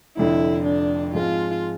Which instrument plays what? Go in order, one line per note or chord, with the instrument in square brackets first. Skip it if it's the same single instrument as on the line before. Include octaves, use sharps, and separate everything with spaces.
[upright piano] F1 F2 D3 [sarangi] E4
[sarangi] D4
[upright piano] G#2 F3 G#3 C4 [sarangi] F4